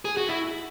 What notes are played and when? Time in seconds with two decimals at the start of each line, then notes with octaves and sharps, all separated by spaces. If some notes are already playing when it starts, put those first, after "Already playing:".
0.05 G#4
0.17 F#4
0.29 E4